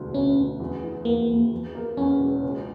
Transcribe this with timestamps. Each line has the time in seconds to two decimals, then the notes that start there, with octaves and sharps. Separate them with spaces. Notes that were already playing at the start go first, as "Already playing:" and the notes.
Already playing: E1 D2
0.14 D2 C#4
0.37 D2
0.60 E2
0.83 E3
1.05 E2 A#3
1.29 E2
1.51 E2
1.75 A#3
1.97 E2 C#4
2.20 E1
2.44 C#2